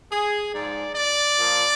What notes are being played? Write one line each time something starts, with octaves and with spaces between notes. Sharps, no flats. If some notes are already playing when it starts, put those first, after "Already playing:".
G#4
G#2 F3 D5
D5
A#2 F3